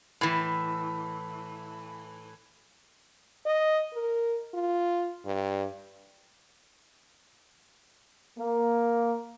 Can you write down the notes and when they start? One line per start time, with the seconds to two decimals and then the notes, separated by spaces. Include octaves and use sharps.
0.21 A2 E3
3.46 D#5
3.93 A#4
4.54 F4
5.25 G2
8.39 A#3